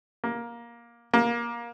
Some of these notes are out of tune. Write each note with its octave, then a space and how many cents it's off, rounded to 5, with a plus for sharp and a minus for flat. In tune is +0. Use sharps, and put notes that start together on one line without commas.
A#3 +15
A#3 +20